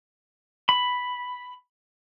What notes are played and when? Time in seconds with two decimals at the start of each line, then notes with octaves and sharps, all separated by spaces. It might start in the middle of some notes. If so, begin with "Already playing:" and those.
0.69 B5